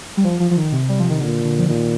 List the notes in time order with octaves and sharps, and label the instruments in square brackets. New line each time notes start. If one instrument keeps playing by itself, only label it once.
[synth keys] G3
F3
F3
F3
D#3
C3
G3
F3
D#3
[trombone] A#2 [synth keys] D3
[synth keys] D3
F3
[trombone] A#2 [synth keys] D#3